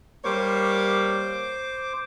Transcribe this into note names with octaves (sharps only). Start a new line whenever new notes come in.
G3 A#3 C5 C#5 D6